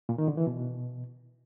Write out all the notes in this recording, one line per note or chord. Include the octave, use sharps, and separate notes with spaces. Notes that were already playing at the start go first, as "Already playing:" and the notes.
A#2
D#3
D3
E3
B2